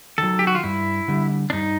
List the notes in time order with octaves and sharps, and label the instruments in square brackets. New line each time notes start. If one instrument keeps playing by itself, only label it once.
[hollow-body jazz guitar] D#3 F#3 [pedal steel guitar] A4
[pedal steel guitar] G4
F#4
F4
[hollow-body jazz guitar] G2 [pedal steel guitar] E4
[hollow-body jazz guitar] D3 G3
[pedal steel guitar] D4
[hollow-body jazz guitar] G2 [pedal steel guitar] D#4